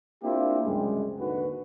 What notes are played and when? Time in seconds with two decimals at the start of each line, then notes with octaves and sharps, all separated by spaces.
0.23 A#3 C4 D4 E4 F4 G4
0.65 C#2 F#2 C3 G3 G#3
1.19 G#1 D#2 D3 F#4 B4